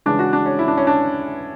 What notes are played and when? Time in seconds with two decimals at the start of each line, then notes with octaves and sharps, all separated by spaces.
0.06 C#3 E3 G#3 D4
0.19 F#4
0.33 D4
0.46 C#4
0.59 E4
0.68 D4
0.77 C#4
0.87 D4